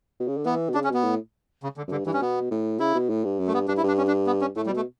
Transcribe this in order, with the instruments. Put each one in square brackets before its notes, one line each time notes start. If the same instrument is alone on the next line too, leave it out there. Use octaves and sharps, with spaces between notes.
[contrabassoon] B2
C#3
D3
[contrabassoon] E3 [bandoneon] B3
[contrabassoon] B2
[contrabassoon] C#3 [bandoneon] D4
[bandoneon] C#4
[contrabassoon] B2 [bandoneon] B3
[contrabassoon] A2
[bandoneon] C#3
D3
[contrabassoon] F#2
[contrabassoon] G2 [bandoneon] D3
[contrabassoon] G2 [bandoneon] E3
[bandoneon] C#4
[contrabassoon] B2 [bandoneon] B3
[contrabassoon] A2
[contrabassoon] C#3 [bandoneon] E4
[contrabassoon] B2
A2
G2
F#2
[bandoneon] A3
[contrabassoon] G2 [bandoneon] B3
[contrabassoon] G2 [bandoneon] D4
[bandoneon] E4
[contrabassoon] G2 [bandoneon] D4
[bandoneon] C#4
D4
B3
C#4
[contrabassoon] A2 [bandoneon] A3
[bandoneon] G3
[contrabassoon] B2
[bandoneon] A3